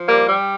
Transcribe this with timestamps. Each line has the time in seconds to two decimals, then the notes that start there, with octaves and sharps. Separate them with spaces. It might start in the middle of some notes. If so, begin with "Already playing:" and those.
Already playing: F3
0.09 G3 A#3
0.28 G3